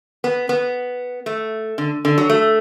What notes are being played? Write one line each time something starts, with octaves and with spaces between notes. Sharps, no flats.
B3
B3
A3
D3
D3
F#3
A3